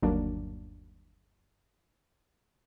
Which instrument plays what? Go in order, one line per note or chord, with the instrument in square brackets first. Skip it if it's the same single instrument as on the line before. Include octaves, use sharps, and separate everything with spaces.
[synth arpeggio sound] G1 D#2 F#3 A#3 D4